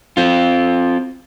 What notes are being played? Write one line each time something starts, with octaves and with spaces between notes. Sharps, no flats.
C4 F4